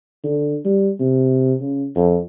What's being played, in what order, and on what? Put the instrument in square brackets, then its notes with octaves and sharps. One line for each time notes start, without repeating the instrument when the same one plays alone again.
[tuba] D3
G3
C3
C#3
F2